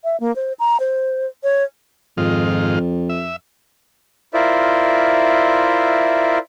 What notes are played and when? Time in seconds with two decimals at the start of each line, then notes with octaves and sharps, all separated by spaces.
0.04 E5
0.20 A#3
0.36 C5
0.59 A#5
0.80 C5
1.43 C#5
2.17 F2 G#2 D#3 F4
3.09 E5
4.34 E4 F4 A#4 C5 D5 E5